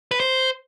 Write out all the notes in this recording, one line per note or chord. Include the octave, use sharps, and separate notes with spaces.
B4
C5